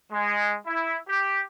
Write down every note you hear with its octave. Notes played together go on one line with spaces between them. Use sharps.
G#3
E4
G4